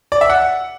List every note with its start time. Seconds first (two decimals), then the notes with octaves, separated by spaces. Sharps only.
0.12 D5
0.21 E5
0.30 F#5